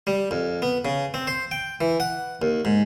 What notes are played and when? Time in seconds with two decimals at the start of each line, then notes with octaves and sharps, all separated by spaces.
0.07 G3
0.31 F2
0.62 B3
0.85 C#3
1.14 C4
1.27 C5
1.51 G5
1.81 E3
2.00 F#5
2.42 D#2
2.65 G#2